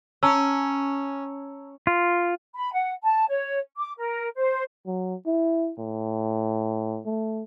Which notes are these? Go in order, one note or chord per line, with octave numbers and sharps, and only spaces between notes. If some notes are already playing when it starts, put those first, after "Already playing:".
C#4 A5 A#5 E6
F4
B5
F#5
A5
C#5
D6
A#4
C5
F#3
E4
A2
A3